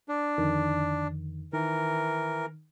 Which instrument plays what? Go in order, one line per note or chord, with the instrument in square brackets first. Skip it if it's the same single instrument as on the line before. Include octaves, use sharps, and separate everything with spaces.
[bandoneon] D4
[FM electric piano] F2 D3 D#3
[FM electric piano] D#3 [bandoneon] E3 A#4